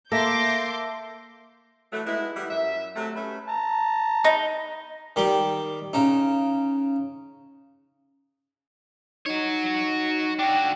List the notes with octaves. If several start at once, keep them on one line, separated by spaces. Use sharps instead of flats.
A#3 A4 E5 C6 D6 G6 A#6 B6
E3 F#3 A3
G#3 B3 D#4 E4
E3 G3 B3 E4
F#2 E5
C3 F#3 A3
A3 C#4 B4 E5
A5 A#5
D#4
D#3 G3 G4
C#3 D#4
D#4 F#4 C#5
D4 F#4 G5